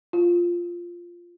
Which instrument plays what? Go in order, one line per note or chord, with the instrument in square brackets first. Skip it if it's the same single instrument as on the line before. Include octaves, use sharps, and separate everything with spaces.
[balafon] F4